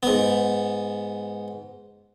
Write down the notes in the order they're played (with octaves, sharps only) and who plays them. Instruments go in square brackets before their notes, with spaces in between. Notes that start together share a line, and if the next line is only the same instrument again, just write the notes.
[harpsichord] G#2 B3